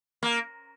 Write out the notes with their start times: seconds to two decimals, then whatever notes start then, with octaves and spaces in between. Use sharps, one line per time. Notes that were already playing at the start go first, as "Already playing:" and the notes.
0.23 A#3